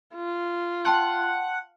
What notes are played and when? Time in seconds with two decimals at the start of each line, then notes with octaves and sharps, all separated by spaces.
0.15 F4
0.85 F#5 G5 A5 C6